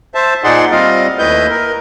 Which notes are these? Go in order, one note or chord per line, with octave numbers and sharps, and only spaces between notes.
C5 E5 A5
A#2 D#4 G#4 D5 F#5 C6
G3 C4 F4 D#5 F5
D#2 A3 E4 B4 D#5 G6
A#4